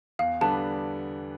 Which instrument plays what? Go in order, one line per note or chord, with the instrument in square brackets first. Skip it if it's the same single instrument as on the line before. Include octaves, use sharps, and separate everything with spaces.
[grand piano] E2 [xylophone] F5
[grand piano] D3 G3 B3 D4 [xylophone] A5